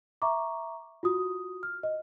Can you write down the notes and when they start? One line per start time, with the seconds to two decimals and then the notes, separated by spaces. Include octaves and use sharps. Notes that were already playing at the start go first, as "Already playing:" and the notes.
0.22 E5 A#5 C#6 D6
1.03 F4 F#4 D#6
1.63 F6
1.83 D#5